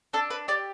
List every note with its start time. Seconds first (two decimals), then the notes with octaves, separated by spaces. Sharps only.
0.13 D4 A4
0.30 B4
0.48 G4 D5